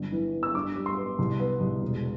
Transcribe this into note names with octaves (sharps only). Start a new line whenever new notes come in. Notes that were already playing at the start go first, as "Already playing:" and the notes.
Already playing: G1
E3
B3
E6
G2 D6
G3
C6
B3
C2
B3
C2
E1